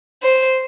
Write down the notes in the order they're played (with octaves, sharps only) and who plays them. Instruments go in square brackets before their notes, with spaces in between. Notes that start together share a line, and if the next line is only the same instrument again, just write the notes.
[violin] C5